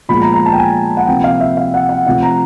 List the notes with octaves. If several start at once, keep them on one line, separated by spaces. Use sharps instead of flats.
A#2 F3 G#3 B3 B5
A#5
A#5
A5
G5
G#5
F#5
C3 F3 A#3 G5
F5
E5
F5
F#5
F#5
C3 F3 A3 F#5
A#5